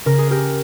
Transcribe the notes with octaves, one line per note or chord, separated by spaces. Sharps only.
C#3 A#4
G#4
G4 A#4